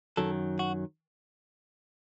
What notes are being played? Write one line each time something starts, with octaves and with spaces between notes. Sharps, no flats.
F#2 D#3 F#3 A4
F#4